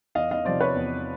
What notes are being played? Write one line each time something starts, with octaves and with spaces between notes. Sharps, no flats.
E2 D#5 F5
D#5 F5
C3 F3 C5 D5
B4 C#5
E2